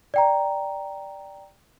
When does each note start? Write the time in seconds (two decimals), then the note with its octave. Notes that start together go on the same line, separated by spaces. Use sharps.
0.14 D5 G5 A#5